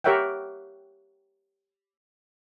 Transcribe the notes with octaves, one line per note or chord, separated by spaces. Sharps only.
G4 A#4 C#5 E5 F#5 G5